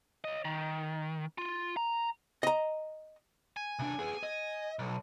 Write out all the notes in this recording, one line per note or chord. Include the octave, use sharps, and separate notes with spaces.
C#5 D#5
D#3
F4
A#5
D#5 A#5
G#5
C3 D4
B3 G#4
D#5
B1